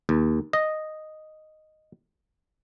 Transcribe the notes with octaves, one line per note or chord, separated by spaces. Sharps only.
D#2
D#5